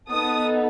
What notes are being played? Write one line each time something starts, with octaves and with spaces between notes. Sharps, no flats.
B3 D#4 A4 D#6